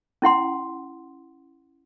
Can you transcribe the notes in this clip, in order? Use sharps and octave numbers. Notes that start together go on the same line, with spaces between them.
C#4 E4 F#5 C6